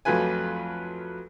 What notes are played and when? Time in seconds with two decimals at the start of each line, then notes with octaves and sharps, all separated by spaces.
0.05 F2 F#3 A3 F4 B4 G#5